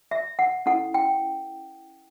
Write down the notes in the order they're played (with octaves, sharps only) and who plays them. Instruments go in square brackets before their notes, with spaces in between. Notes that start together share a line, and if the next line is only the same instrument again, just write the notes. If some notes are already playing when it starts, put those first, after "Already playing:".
[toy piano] E5
F#5
C#4 E4 A4 F#5
G5